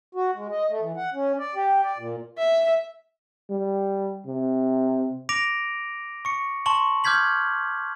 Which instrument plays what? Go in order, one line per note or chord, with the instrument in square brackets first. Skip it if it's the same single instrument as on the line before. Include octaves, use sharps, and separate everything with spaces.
[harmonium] F#4
G#3
D#5
A3
E3
F#5
C#4
D5
G4
D5
A#2
[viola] E5
[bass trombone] G3
C3
[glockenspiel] D6 A#6 D7 F7
C#6 C#7
A5 C6 C#6 F#7
D6 F6 G6 G#6 B6 F#7